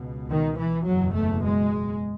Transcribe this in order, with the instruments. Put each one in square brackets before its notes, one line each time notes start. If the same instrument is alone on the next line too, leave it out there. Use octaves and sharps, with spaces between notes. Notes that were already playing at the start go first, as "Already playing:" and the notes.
Already playing: [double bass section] C#2 B2
D#3
E3
F#1 E2 B2 F#3
A3
G#3